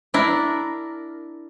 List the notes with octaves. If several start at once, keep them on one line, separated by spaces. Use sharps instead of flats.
D4 E4 A#4